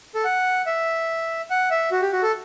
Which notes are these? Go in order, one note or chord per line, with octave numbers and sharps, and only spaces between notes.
A4
F#5
E5
F#5
E5
F#4
G4
F#4
A4